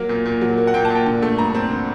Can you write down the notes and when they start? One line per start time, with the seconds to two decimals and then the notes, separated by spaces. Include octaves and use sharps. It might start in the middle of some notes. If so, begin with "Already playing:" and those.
Already playing: F#3 A#3
0.09 A#2
0.25 A#2
0.41 F#3
0.58 A#3
0.67 F#5
0.74 A#2 G5
0.85 A5
0.90 A#2
0.95 G5
1.06 D3
1.22 A3
1.38 G2 A#5
1.54 C4
1.71 D3